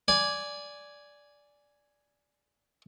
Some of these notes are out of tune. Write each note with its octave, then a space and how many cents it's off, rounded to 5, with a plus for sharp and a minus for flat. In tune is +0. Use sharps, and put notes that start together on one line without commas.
D5 -10 G#5 +0